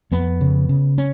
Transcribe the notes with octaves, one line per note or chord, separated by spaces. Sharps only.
F2 B3
C#3
C#3
C#4